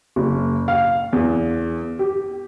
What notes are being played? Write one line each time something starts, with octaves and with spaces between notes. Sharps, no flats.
F#1
F5
E2
G4